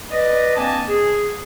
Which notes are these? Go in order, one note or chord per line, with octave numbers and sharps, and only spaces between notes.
B4 D5 D#5
A#3 C4 D4 D#5 G#5 A5
G#4